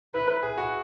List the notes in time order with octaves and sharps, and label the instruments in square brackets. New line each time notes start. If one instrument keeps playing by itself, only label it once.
[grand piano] E4 [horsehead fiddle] B4
[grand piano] G#4
F#4